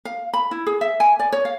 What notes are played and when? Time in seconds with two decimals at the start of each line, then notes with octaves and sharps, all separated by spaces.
0.05 F5
0.33 B5
0.51 E4
0.67 G#4
0.81 E5
1.00 G#5
1.19 D5
1.32 C#5
1.45 F5